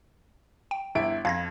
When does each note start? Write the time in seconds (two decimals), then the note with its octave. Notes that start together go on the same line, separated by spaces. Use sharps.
0.71 G5
0.95 G1 E4 D7
1.25 F2 F5 G#6 A#6